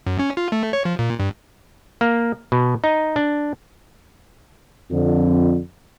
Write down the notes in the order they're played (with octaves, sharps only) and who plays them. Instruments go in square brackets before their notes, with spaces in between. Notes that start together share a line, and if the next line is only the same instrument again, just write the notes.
[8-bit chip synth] F#2
C#4
F4
A3
C#5
F3
A#2
G2
[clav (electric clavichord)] A#3
B2
D#4
D4
[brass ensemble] F2 D3